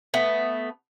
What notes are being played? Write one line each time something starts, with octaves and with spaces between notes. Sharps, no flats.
A3 B3